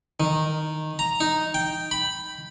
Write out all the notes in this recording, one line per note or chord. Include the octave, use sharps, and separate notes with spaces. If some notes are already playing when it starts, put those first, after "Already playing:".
D#3
A#5
D#4
G5
B5